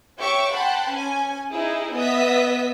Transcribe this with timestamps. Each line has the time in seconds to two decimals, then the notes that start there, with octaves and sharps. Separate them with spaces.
0.19 G4 C#5 E5 C#6 D6
0.52 F#5 G5 A5 B5 C6
0.94 C#4 G#5
1.51 D#4 E4 G#4
1.95 B3 D#5 E5 D#6 B6